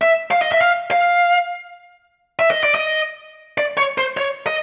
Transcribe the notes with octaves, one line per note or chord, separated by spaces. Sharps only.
E5
F5
D#5
E5
F5
F5
E5
D#5
D5
D#5
D5
C#5
C5
C#5
D#5